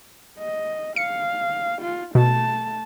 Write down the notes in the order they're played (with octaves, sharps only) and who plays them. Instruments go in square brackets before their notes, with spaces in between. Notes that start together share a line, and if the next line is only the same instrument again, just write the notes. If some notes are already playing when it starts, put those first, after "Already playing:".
[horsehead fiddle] D#5
[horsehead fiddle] F5 [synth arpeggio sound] C#7
[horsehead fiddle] F4
[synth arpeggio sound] B2 [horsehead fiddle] A3 A5